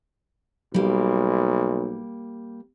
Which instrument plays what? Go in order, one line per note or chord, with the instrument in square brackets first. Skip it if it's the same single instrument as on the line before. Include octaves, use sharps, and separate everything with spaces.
[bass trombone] B1 [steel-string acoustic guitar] G3 A#3